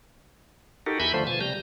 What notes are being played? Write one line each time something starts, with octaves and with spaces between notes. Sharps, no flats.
D#4 F#4 G4 A4 A#4
E2 E5 G#5 B5 G6
D3 F3 A3 C5
B2 F3 G#5 A5
C3 G3 A#5 G6